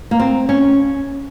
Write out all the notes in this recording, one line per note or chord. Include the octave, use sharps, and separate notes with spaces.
A#3
C4
C#4